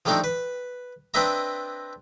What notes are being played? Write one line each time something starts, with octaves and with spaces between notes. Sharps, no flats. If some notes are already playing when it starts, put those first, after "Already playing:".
F3 G3 A3 C4 D4 D#4
B4
C4 D4 B4 D#5 E5 A#5